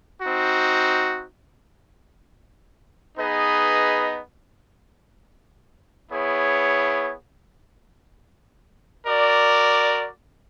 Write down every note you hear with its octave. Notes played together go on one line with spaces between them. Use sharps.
C4 D#4 F#4
B3 D#4 G#4 B4 D#5
B3 E4 G#4 C#5
F#4 A#4 D5